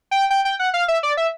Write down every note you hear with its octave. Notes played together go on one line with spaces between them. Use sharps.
G5
G5
G5
F#5
F5
E5
D5
E5